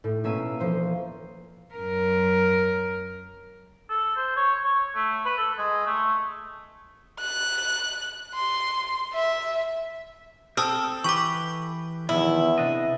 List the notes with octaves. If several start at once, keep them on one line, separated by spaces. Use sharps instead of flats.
A2
B2 A#3 C#4 E5 B6 D#7
E1 F3 C5
F#2 A#4
A4
C5
C#5
C#5
A3
B4
A4
G#3
A3
F#6
C6
E5
C4 A4 A5 D#6 F6
E3 G4 B4 C#6 D6
E2 D#3 F3 B3 E4
C3 D4 D#5